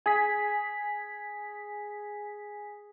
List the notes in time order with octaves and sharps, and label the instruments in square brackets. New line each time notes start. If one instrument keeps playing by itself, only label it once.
[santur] G#4 [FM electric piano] G#5 B6